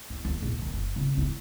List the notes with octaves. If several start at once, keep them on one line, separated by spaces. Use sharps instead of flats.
E2
D#2
A#1
D#3
F#1
C#3
E4